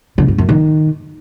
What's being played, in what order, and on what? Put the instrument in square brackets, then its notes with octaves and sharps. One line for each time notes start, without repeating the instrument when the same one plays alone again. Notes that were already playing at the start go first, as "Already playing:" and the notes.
[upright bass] D3
G2
F#2
D#3